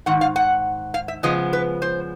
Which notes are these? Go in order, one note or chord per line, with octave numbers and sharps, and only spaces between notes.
G#2 D#3 F#5
F5
F#5
F5
E5
C#3 F3 G#3 B3 D#5
B4
C5